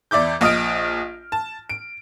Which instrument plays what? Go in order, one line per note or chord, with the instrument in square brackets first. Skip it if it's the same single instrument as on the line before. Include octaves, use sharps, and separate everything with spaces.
[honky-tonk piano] E2 D5 E5 D6 G6
A#1 D#5 D#6 F6 D7
A5
D7